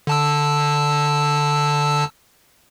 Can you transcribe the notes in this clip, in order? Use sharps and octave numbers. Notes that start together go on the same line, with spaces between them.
D3 A5 E6